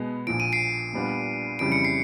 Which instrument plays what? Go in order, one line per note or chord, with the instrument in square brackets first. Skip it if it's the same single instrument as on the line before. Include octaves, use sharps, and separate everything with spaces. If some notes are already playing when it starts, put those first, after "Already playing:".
Already playing: [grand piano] B2 G#3 B3
[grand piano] A#1 A#2 F3 [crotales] D7
[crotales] D#7
C7 D7
[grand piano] A#2 G3 B3 D4 F4
[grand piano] F2 C#3 E3 G3 [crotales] D7
[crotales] C#7
C7